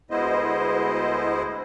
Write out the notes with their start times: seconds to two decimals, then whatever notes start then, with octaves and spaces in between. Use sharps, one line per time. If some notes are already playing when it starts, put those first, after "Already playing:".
0.11 D2 G#3 B3 E4 C5 D#5